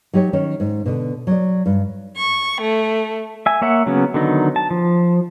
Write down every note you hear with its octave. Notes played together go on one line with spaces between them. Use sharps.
F#3 D#4 G4 C#5
D#3 C#4 C#5
G#2
B2 D3
F#3 D5
G2
C#6
A3
E5 G#5
A#3 C#5 E5 F#5
C#3 F#3 A#3 B3 C#4
D3 D#3 F#3 B3 D#4
A5
F3